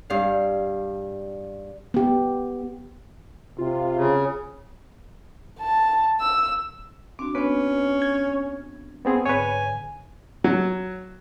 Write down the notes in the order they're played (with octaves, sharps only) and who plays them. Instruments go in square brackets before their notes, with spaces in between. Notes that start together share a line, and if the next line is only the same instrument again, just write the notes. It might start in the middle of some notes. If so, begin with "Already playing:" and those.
[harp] G2 F5
[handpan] B3 G4
[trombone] C3 [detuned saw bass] F4
[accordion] C#3
[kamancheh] A5
E6
[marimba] C4 D4 F#4 [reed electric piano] D6
[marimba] B3 D4 [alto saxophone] C#4 [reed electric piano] B4
[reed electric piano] G#6
B3 C4 G#4
[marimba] G#2 D3 [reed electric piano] B4 C#5 [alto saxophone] G#5
[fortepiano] F#3